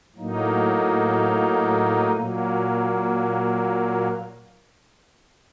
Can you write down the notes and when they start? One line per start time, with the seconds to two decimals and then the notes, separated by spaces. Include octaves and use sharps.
0.16 A2 F#3 A#3 D#4
2.12 A#2 F#3 A#3